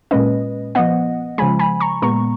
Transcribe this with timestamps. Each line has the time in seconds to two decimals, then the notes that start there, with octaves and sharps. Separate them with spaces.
0.11 A#2 G#3 C#4 B4 D#5
0.75 F3 B3 D#5 F#5
1.38 C#3 F3 G#3 G#5 B5
1.59 G#5 B5
1.80 A#5 C#6
2.02 A#2 G#3 B3 A#5 C#6